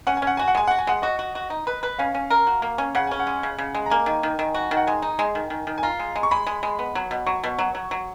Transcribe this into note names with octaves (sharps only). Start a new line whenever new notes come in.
C#4 F#5
G#5
C#4 F#5
F#4 G#5
F#5
G#3 G#5
F#4 F#5
G#5
G#3 F#5
F#4 D#5
F#4
F#4
D#4
B4
B4
C#4 F5
C#4
A#4
F#4
A#3
C#4
C#3 F#5
C#4 G#5
F#5
G#3
C#3
C#3
G#3
A#5
A#3 G#5
D#3
D#3
D#3
F#4
D#3
F#5
G#3 G#5
D#4
G#3
D#3
D#3
D#3
G#5
F4 A#5
G#3
G#3
C#6
G#3 B5
G#3
G#3
B3
F#3
B2
F#3 C#6
B2
F#3
F#3
F#3